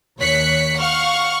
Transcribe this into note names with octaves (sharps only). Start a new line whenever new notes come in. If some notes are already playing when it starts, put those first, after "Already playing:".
D#2 C#5 F#6 B6 C#7
F5 F#5 C#6 F6